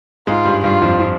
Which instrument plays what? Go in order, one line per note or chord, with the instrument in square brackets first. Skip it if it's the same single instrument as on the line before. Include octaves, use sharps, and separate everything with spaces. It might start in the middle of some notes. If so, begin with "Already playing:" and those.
[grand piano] G#2 G#3 [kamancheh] F4
[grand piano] G2 G3
[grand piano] G2 G3 [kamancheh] F4
[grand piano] F2 F3
F3